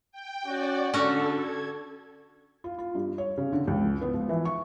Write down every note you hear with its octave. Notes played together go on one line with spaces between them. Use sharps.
G5
C#4 F#4 D5
D3 C#4 F#4 A4
G#6
F4
F4
G2
C#5
C#3
D3
C#2
B3
F3
E3
C#6